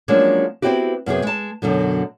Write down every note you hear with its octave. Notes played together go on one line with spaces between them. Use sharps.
F3 F#3 G#3 A#3 C#4 D4
B3 C4 D4 E4 F#4 G4
F#2 C3 B3 G#4
G#3 A5
F#2 B2 D3 F#3